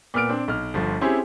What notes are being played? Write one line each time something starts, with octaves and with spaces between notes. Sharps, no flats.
A#2 B3 F6 D7
C4 D4
B1 F6
G1 F3
C4 C#4 E4 G4 G#4 C5